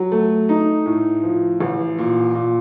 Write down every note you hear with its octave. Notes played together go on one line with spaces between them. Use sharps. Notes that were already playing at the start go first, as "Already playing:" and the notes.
Already playing: F#3
A3
D#4
A2
F3
A1
A#2
A#2